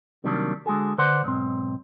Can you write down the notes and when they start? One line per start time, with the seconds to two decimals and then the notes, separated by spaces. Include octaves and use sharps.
0.24 C3 D#3 F#3 G3 A#3 D4
0.66 D3 G#3 F#4 G#4 A4
0.98 D3 B4 C5 D5 F#5 C6
1.24 B1 G#2 C4